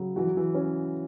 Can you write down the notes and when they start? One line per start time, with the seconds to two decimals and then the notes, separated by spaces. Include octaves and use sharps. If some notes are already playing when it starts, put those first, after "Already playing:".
Already playing: C#3 F#3
0.16 E3 F#4
0.27 F#3
0.37 E3
0.55 C#4